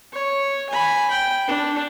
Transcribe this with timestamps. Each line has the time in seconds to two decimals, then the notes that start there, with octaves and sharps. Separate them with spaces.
0.13 C#5
0.69 G#5 B5
1.11 G5
1.48 D4